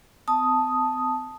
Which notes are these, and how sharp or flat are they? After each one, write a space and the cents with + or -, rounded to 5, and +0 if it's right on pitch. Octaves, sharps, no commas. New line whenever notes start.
C4 -45 A5 +0 D#6 +0